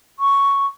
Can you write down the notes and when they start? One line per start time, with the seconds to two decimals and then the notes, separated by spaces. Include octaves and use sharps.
0.20 C#6